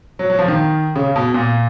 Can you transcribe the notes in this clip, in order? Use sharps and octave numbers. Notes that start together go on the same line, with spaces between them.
F#3
F#3
F3
D#3
C#3
B2
A#2